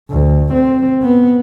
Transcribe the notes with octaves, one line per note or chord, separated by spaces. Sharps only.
D2
C4
B3